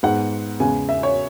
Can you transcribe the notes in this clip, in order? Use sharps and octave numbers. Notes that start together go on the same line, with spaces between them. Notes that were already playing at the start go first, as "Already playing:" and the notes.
G#2 G#3 B3 F#5
E2 C#3 G#3 G#5
E5
C#5